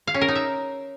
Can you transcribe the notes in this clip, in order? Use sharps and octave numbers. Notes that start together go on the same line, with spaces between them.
F5
C#4
A#4
D#4
E5